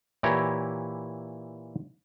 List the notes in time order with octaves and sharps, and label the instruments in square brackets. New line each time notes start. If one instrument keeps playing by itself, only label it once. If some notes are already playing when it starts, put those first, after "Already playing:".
[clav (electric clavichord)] A#2 E3 E4 G4 C#5 A#5